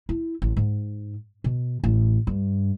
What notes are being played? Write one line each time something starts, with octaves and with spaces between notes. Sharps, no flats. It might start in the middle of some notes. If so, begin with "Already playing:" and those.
E4
A1
G#2
B2
A1
G2